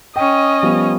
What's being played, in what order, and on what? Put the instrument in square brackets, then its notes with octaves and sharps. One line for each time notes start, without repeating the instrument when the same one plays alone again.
[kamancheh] C#4 D#5 [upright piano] G5
[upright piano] F3 G3 B3